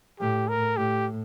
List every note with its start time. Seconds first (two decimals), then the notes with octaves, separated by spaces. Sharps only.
0.20 A2 G4
0.48 A#4
0.77 A2 G4